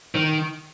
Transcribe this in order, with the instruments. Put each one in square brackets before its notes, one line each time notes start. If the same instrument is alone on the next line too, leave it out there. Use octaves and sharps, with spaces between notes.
[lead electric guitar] D#3